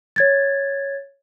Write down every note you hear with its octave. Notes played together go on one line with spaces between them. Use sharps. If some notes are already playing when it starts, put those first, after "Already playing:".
C#5 G#6 A6